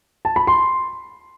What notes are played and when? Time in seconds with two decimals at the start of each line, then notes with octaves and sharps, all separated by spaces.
0.25 A5
0.36 B5
0.47 C6